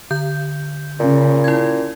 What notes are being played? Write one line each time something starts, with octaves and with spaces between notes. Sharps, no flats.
D3 G6
A#2 C#3
E4 G#6